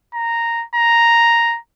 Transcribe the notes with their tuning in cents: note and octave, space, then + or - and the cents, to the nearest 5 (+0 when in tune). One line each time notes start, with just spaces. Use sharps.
A#5 -5
A#5 +0